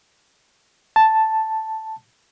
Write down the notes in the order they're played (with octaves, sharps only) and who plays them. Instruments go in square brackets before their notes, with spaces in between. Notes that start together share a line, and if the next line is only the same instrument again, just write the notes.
[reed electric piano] A5